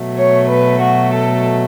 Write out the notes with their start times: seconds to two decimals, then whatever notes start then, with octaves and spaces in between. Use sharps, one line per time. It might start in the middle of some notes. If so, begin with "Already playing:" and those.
Already playing: B2 F#3 A3
0.16 C#5
0.48 B4
0.81 F#4
1.13 A4